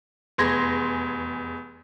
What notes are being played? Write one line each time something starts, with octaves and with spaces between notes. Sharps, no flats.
F1 E2 G#4 C6 G#6 A#6